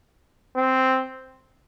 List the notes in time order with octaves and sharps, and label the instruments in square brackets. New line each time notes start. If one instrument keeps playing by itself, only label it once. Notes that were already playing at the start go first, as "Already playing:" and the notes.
[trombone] C4